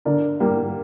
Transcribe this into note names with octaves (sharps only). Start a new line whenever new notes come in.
D3 A#4 D5
G3 A#3